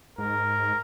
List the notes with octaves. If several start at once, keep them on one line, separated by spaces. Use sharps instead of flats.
G#2 A#4